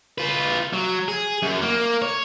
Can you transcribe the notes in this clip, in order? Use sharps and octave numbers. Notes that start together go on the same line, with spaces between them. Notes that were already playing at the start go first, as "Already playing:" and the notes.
F4 B4
F#3
G#4
F#2
A#3
C#5